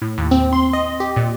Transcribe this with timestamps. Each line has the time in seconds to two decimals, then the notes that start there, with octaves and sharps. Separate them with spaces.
0.02 A2
0.18 D#2
0.31 C4
0.53 C6
0.73 D#5
1.00 G4
1.16 A#2